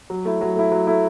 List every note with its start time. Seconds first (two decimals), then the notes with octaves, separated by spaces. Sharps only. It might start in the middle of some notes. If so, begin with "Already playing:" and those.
0.10 F#3
0.25 A3 E4
0.41 F#3
0.56 A3 E4
0.72 F#3
0.87 A3 E4